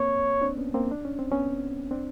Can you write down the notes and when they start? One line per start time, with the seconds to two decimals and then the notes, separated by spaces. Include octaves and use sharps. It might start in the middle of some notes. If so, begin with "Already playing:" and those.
Already playing: A#3 C4 C#5
0.41 C4 D4
0.57 B3 C#4
0.74 A#3 C4
0.91 D4
1.05 C#4
1.19 C4
1.32 B3 C#4
1.91 C4 D4